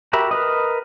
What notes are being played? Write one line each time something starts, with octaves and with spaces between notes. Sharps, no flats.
F#4 G4 A#4 E5 B5
A#4 B4 D#5